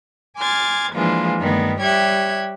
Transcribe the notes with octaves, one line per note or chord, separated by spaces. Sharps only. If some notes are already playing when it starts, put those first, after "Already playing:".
G#5 C6 D6 F6 G#6 A6
E3 F3 G#3 A#3 D4 F4
G2 D#3 A3 B3
G3 G4 C#5 E5 F#6 G#6